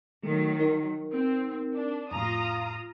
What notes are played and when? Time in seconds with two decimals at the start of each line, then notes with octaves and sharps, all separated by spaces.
0.23 D#3 F#3 A3
0.59 D#4 A#4
1.13 C4
1.74 D4
2.11 F2 A2 F4 A#5 D#6